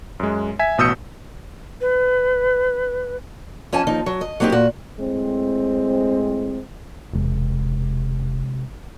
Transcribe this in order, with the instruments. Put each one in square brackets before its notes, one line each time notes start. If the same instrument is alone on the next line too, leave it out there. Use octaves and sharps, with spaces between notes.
[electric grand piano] F#2 G#3
E5 G#5 G#6 B6
A1 B2 D#6 E6 G6 C#7
[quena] B4
[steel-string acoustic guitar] F2 C#4 G#5 A5
D#2 F3 D#4
F#3
D#5
F#3 A#3 C4 D#4 G4
A#2 F#4
[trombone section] A2 G#3 C4
[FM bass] E1 [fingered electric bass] C3 G#3